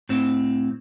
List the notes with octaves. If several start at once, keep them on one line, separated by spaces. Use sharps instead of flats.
A2 C4